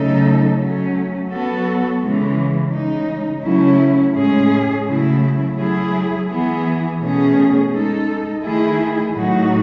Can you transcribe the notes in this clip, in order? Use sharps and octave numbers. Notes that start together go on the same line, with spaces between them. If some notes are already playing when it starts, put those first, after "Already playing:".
Already playing: C#3 F#3 A3 D#4 A4
F#3 A3 C#4
F#3 B3 F#4 A4
C#3 E3 G#3
C#3 G#3 D#4
C#3 F#3 A3 C#4 E4
A2 G#3 C#4 G#4
C#3 F#3 A3 E4
F#3 A3 E4 G#4
E3 B3 E4 G#4
B2 A3 C#4 G#4
G#3 D#4 A4
D#3 A3 E4 G#4
A2 F#3 A3 D#4 F#4